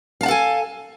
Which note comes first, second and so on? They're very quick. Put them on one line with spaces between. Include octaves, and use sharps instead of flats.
F5 A5 F#5 A4 G#5